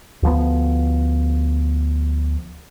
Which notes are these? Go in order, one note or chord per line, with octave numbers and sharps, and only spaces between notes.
D2 F3 B3